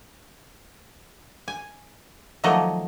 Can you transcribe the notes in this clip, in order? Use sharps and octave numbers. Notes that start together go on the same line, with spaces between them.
G#5
D#3 F3 F#3 A3 A#3 D#5